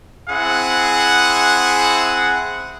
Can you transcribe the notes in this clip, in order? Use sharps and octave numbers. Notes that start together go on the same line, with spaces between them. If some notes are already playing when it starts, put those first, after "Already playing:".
C4 E4 G#4 F#5